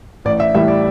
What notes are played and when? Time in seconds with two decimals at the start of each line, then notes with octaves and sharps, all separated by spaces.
0.25 A1 D5
0.40 E5
0.55 A2 E3 G3 E5
0.68 D5